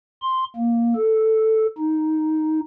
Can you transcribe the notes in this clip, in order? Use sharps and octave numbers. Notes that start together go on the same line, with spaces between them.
C6
A#3
A4
D#4